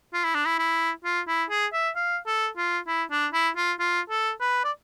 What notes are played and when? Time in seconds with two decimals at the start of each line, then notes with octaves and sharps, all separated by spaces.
0.13 F4
0.24 E4
0.35 D4
0.46 E4
0.59 E4
1.05 F4
1.28 E4
1.50 G#4
1.73 E5
1.96 F5
2.26 A4
2.57 F4
2.87 E4
3.11 D4
3.33 E4
3.57 F4
3.79 F4
4.10 A4
4.41 B4
4.65 D5